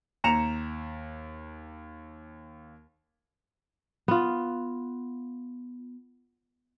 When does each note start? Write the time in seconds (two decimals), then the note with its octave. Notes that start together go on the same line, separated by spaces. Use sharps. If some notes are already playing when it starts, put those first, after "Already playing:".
0.24 D#2 A#5 C#7 E7 F7
4.08 B3 F4